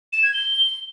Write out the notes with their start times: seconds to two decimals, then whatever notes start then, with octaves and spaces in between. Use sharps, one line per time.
0.13 E7
0.23 G#6
0.34 G7